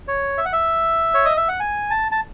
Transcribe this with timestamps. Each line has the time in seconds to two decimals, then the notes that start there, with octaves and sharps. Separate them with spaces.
0.08 C#5
0.38 E5
0.45 F#5
0.53 E5
1.14 C#5
1.25 D#5
1.37 E5
1.48 F#5
1.60 G#5
1.90 A5
2.12 A5